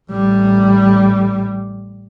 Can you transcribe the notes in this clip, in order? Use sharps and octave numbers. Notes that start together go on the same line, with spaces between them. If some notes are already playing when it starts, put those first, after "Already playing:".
A1 G3